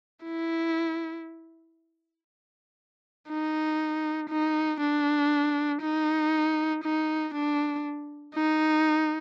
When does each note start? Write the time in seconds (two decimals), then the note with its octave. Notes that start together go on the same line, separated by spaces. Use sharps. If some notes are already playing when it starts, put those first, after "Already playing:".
0.24 E4
3.29 D#4
4.30 D#4
4.80 D4
5.82 D#4
6.84 D#4
7.34 D4
8.35 D#4